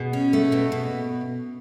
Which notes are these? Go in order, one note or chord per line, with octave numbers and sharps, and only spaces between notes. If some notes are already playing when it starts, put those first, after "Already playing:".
Already playing: B2 G#4
C#4
A3
B2
B2